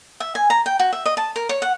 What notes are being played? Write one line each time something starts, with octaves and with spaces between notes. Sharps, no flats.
E5
G#5
A#5
G5
F#4
E5
D#5
A5
A#4
C#5
F#5